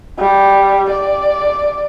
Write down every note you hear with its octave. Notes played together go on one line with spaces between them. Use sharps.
G3
D5